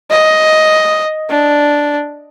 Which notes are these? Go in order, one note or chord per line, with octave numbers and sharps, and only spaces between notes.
D#5
D4